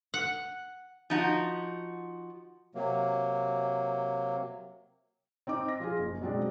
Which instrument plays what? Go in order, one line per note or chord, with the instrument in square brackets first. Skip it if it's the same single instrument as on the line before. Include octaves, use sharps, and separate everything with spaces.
[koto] F#5
[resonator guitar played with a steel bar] F3 D#4 F#4
[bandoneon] C3 F#3 A#3
[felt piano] C4 D#4 D#5 D6
A#6
F3 F4 G#4
F#1
B2 F#3 G#3 C4 D4